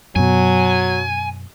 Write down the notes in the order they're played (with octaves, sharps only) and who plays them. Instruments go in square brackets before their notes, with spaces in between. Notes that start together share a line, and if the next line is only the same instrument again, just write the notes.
[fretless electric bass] F#2 B2 [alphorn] F#3 [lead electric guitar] G#5